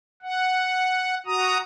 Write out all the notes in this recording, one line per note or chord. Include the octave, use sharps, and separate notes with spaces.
F#5
F#4 A#5 D#6